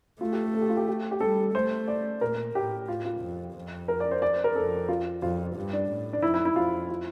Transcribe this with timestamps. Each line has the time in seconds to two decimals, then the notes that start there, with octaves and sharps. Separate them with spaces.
0.21 A3 F4
0.32 G4
0.44 A4
0.54 A4
0.61 G4
0.69 F4
0.77 G4
0.88 G4
1.11 G4
1.20 G3 A4
1.55 A3 C5
1.88 D5
2.21 A#2 A#4
2.55 A2 G4
2.88 A2 F4
3.05 F4
3.21 F2
3.55 F2
3.88 A#4
4.00 D5
4.11 C5
4.22 D5
4.33 C5
4.44 A#4
4.56 F2 A4
4.89 F4
5.22 F2 F4
5.56 G2
5.73 D4
5.89 A2
6.13 D4
6.22 F2 E4
6.34 E4
6.45 E4
6.56 F2 F4
6.89 F4